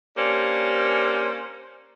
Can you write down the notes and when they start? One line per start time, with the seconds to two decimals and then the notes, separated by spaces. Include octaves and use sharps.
0.17 A#3 C#4 D4 G4 C5